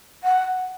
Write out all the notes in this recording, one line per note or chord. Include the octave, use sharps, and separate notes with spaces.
F#5